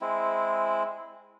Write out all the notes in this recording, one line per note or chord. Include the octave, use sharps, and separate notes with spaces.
G#3 C4 E4